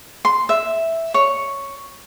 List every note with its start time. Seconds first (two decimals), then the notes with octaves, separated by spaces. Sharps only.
0.25 C6
0.49 E5
1.14 C#5